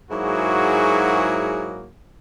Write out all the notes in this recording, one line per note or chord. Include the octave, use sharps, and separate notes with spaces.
G#2 F#3 A#3 E4 F#4 G#4